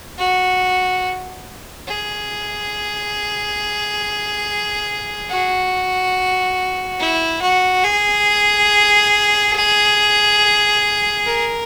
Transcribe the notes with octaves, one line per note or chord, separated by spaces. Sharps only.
F#4
G#4
F#4
E4
F#4
G#4
A#4